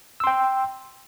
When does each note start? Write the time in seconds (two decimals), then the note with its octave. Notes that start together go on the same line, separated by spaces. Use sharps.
0.20 E6
0.24 C6
0.27 G5